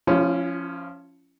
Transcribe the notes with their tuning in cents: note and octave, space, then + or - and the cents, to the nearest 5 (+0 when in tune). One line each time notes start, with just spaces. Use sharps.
F3 +0 C#4 +0 E4 +45